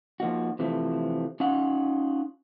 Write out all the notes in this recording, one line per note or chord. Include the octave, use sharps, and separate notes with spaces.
F3 A#3 D#4 F#4
C3 E3 F3 A3
C#4 D#4 F4 F#5